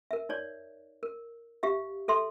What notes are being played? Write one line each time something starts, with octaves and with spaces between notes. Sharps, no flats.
A#4 E5
D#4 C#5 D5
A#4
G4 E5 F5
A4 E5 C6